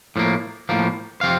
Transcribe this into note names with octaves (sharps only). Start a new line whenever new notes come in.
A2 F3 A#3
A2 F3 A#3
C3 F3 C4 F5